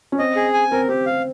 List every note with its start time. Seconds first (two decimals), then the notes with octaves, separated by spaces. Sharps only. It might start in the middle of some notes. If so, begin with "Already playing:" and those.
0.12 C#4
0.19 C4 D#5
0.36 G#4
0.54 G#5
0.72 C4 A#4
0.89 C4 G4
1.06 F5